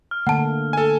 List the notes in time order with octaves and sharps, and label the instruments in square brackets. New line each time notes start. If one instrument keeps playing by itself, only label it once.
[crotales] F6
[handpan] D3 A3 A#3 [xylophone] F#5 A5
[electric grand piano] A4 G#5